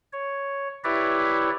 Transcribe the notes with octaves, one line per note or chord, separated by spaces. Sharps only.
C#5
E4 G4 B4 C#5 D5 E5